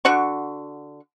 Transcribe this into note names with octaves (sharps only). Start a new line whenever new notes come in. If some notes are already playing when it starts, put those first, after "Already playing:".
D3 F#4 F#5 C#6